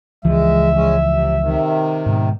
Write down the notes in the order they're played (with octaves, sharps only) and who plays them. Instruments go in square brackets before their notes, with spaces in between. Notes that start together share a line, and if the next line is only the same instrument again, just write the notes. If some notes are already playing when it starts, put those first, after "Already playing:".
[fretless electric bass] C#2 E3 F3 [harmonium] G#3 [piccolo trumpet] E5
[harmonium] G#3 C#4
C3
C3 D#3
[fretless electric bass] G#2 B2